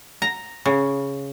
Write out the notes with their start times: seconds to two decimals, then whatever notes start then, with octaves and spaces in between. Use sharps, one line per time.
0.22 A#5
0.66 C#3